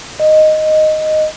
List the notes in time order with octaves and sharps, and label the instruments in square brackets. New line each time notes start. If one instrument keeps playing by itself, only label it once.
[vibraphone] D#5